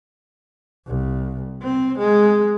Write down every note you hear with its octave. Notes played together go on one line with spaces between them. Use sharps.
C2
C4
G#3